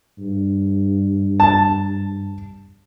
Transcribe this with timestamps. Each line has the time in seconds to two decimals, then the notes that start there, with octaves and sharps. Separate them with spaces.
0.19 G2
1.40 A5